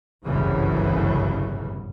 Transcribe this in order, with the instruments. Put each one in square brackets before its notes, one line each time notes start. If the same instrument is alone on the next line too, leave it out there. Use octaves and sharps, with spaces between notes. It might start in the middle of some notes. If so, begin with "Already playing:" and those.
[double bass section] G1 C2 F#2 A2 C#3 E3